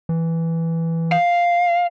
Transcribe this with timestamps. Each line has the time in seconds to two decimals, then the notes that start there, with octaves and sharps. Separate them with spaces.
0.09 E3
1.12 F5